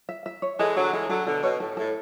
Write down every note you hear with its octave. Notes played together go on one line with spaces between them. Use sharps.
E5
E5
C#5
E3 G#3 A4
D3 F#3 C#5
E3 G#3 A4
D3 F#3 A4
B2 D3 A4
B2 C#5
A2 A4
A2 A4